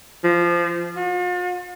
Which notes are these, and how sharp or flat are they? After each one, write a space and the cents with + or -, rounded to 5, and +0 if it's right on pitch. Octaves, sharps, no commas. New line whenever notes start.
F3 -15
F4 +45